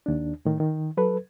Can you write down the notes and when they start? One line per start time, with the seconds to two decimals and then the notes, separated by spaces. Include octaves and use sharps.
0.06 D#2 D4
0.45 A2 D#3
0.60 D#3
0.97 F#3 A4 B4